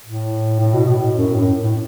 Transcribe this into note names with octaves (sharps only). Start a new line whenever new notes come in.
A2
A2
B2
A2
F#2
A2
A2